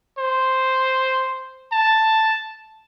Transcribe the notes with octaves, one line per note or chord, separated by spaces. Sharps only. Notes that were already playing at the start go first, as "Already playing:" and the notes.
C5
A5